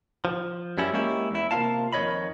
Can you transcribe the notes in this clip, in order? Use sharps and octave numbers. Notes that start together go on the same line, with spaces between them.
F3
F#2 G3 C#4 E4
G#3 A#3 C#4 E4 G4
E2 E4
C3 A#3 B3 F4 F5 A5
F2 D#3 B4 C#5 D#5 B5